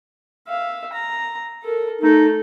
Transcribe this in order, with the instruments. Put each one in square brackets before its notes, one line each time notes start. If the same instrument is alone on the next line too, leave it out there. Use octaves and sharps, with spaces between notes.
[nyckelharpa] E5 F5
A#5
A4 A#4
[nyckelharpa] A3 A4 [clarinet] D#4